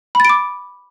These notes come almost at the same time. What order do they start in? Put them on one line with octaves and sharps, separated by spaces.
B5 A6 D7 D6